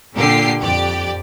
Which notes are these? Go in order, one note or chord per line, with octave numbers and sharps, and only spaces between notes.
A#2 D3 G4 C7
F2 G4 D5